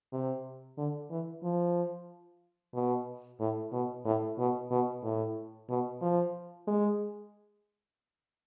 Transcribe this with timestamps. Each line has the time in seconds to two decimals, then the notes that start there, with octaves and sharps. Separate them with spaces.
0.12 C3
0.77 D3
1.10 E3
1.43 F3
2.74 B2
3.40 A2
3.72 B2
4.05 A2
4.38 B2
4.71 B2
5.03 A2
5.69 B2
6.02 F3
6.67 G#3